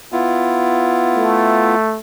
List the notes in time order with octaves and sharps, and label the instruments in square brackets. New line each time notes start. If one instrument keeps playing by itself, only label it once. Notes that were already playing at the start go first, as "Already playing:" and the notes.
[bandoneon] B3 E4 F4
[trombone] A3